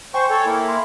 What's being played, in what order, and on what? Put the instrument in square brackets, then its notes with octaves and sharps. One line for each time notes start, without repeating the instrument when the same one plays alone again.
[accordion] C5 C#6 [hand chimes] G5 G#5
[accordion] A4 C#5
A#3 E4
[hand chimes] C6